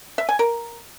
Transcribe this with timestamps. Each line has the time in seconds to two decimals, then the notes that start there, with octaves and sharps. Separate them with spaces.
0.18 E5
0.29 G#5
0.39 A#4